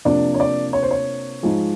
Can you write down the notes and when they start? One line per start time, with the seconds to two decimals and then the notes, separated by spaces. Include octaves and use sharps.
0.05 C3 F3 A#3 D4 D5
0.34 C#5
0.40 D5
0.73 C#5
0.83 C5
0.91 C#5
1.43 G#2 F3 G#3